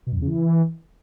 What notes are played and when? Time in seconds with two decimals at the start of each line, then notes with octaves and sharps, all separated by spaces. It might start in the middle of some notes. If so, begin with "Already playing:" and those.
0.07 B2
0.12 F#2
0.17 E2
0.22 C#3
0.27 E3